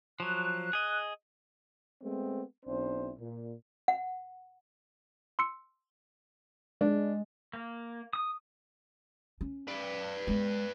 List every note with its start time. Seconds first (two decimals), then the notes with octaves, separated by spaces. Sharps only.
0.20 F3 F#3 F#6
0.73 G#4 D#5
2.03 G#3 A3 B3 C4
2.66 B1 C4 D4 E4 C5
3.19 A#2
3.88 F#5
5.39 C6 E6 C#7
6.81 G#3 D4
7.53 A#3
8.13 D#6
9.41 C#4
9.68 B4 D5
10.27 G#3 B3